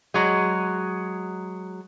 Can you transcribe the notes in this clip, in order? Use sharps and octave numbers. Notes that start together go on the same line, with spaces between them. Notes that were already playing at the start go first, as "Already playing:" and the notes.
F#3 G#3